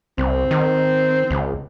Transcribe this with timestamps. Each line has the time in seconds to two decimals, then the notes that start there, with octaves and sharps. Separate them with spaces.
0.18 C2 C4
0.51 D#3
1.31 C#2